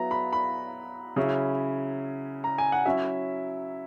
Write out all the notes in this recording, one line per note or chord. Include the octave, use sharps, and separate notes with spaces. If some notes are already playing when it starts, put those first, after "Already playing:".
Already playing: F#3 B3 E4 A#5
B5
B5
C#3 F#3 C#4 E4
A#5
G#5
F#5
F#3 C#4 E4 E5